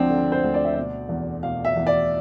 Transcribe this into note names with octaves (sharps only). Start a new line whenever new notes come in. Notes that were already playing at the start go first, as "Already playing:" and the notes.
Already playing: D2 F3 C4 D4
D3
C5
D2
D5
E5
B2 D5
E2
B2 F5
E5
E2
D5